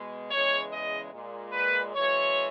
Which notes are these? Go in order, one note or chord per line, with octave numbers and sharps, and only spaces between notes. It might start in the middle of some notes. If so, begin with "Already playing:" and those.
Already playing: B2 G#3
E2 C#3 E3 G#3 C#5
D#5
A#2 G#3
B4
F#2 E3 G#3 C#5